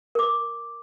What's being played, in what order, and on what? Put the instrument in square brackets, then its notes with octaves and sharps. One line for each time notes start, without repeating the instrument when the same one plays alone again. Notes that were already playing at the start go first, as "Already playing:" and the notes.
[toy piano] A#4 D6